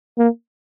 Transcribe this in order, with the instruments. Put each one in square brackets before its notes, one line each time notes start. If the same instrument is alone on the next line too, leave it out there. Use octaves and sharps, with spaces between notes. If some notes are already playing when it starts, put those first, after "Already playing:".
[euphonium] A#3